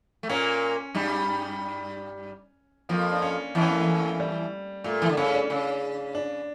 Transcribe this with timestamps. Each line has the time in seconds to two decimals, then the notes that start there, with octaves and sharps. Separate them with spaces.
0.23 A3
0.29 A#2 A#3 C#4
0.95 G2 G3
2.89 F2 F3 A#3
3.12 D4
3.22 C#4
3.55 E2 E3
3.61 C#4
3.69 A#3
3.76 A3
4.20 G3
4.84 A#2 A3
5.00 E3 A3
5.09 D3
5.17 C#3 C#4
5.34 D4
5.50 C#3
6.15 D4